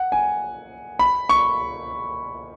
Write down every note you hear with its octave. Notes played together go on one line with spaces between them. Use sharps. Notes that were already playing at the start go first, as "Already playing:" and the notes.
Already playing: F#5
G#5
B5
C#6